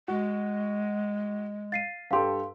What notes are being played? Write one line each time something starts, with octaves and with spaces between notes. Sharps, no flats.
G#3 F#4
F5 A6 C7 D#7
G2 G4 A4 F5 C6